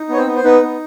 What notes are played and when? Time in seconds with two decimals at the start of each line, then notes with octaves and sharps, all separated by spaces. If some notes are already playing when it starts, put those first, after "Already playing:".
Already playing: D#4
0.09 B3 C#5
0.17 C4 C5
0.27 B3
0.36 C5
0.44 B3 D#4 B4
0.63 B3